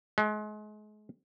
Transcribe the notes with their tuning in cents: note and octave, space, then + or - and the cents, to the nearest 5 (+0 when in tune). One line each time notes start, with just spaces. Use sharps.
G#3 +35